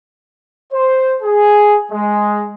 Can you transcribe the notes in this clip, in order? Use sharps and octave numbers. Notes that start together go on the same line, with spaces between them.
C5
G#4
G#3